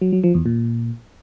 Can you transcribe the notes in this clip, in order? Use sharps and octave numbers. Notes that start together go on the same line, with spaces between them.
F#3
F#3
F3
E2
A#2